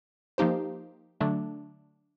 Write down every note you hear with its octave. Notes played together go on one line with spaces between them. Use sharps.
F3 A#3 D#4 G4 C5
D3 F#3 A3 D4